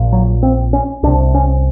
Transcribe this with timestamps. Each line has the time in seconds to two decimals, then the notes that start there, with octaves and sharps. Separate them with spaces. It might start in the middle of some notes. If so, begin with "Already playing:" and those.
Already playing: A#1 A#2
0.13 F#3
0.43 C4
0.73 C#4
1.03 C2 C3 D4
1.35 C#4